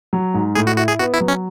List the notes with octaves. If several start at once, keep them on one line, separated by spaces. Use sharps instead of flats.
F#3
G#2
A2 G#4
F#4
E4 F#4
G#4
B3 F#4
E4
F#3
C#4